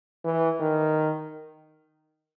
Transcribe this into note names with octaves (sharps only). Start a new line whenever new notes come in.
E3
D#3